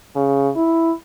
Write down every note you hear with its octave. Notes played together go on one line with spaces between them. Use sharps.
C#3
E4